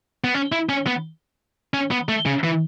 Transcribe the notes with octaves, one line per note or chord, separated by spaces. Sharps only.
B3
C#4
E4
C#4
B3
C#4
B3
A3
C#3
E3